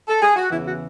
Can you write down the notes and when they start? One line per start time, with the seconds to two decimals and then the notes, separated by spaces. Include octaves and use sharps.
0.08 A4
0.22 G#4
0.36 F#4
0.50 E2 C#3 E3 E4
0.66 F#4